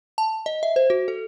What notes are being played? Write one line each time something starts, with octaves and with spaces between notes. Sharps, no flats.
A5
D#5
E5
C5
F#4
A4